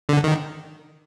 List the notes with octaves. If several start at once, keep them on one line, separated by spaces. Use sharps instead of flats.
D3
D#3